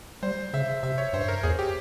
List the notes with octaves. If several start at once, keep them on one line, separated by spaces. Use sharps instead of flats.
G3 C5
C#3 E5
C3 E5
C#5
G2 C5
A#4
E2 G#4
G4